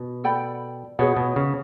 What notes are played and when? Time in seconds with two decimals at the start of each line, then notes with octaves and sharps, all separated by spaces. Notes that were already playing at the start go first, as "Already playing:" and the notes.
Already playing: B2
0.24 A4 D5 G5 B5
0.99 B2 G#4 C#5 F#5
1.17 B2
1.36 C#3